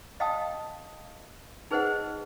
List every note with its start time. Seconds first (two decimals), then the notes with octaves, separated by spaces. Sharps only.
0.20 D#5 F5 G5 A5 D#6
1.71 D#4 G#4 B4 C5 D#5 F#5